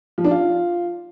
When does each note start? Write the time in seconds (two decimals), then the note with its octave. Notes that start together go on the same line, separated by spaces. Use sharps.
0.18 F3
0.24 D4
0.31 F4